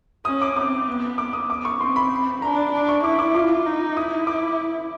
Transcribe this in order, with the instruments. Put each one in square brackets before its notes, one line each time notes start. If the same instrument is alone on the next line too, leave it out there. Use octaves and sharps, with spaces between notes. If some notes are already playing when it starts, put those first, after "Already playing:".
[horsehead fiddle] C#4 [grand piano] D#6
[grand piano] D6
[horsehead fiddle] C4 [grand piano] D6
[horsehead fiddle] B3
[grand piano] D6
D#6
D6
C#6
[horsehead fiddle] C4 [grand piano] C6
[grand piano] B5
[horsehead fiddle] D4 [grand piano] A#5
[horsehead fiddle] D4
[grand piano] C#6
[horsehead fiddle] E4 [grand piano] D6
[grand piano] D6
[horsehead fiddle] F4 [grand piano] D6
[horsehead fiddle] D#4
[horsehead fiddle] E4 [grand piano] D#6
[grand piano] D6